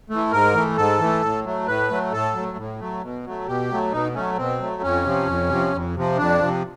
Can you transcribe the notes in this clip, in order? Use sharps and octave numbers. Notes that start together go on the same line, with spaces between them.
E3 A3
G#2 A#4
E3 A3
G#2 A4
E3 A3
A2
F#3 A3
A2 B4
F#3 A3
A2 A4
F#3
A3
A2
F#3 A3
B2
F#3 A3
B2 G4
F#3 A3
B2 D#4
F#3 A3 C#4
B2 C4
F#3 A3
F2 C#4
C3 F3
F2
C3 F3
F2
C3 F3
F2 D4
C3 F3